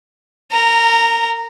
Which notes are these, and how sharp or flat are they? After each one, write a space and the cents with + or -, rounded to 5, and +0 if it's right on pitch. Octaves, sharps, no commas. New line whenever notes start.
A#4 -30 A#5 -10